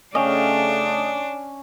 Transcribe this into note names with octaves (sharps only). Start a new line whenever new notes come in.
C#3 A3 C#4 D4 D#5 F5 G5